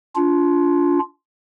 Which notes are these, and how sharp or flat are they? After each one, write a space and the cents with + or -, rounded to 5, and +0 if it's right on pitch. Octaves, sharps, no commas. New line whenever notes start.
D4 -30 F4 +0